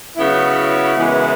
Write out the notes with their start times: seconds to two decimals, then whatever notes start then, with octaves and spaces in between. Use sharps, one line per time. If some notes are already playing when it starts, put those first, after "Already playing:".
0.16 C#3 F#3 B3 E4
0.96 F#2 C#3 E3 G#3 B3